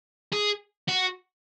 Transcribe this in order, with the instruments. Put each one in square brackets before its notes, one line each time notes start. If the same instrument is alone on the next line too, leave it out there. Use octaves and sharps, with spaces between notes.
[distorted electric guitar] G#4
F#4